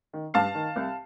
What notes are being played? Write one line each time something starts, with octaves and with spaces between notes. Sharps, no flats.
D#3
G2 F5 A5
D#3
C2